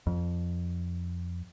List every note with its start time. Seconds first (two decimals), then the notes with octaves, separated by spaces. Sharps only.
0.07 F2